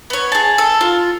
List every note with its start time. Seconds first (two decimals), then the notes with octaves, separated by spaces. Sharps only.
0.10 B3 C#5
0.32 G#4 A5
0.58 A4
0.81 F4